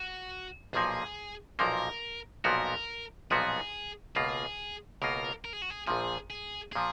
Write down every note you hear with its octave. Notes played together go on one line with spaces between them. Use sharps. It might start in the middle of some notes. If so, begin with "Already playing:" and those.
Already playing: F#4
B1 A#2 F3 A#3 G#4
B1 A#2 F3 A#3 A#4
B1 A#2 F3 B3 F#4 A#4
B1 A#2 F3 B3 F#4 G#4
C#2 B2 A#3 F4 G#4
C#2 B2 A#3 F4 A#4
A#4
G#4
F#4
G#4
A#1 A#2 F3 G#4
G#4
A#2 F3 G#4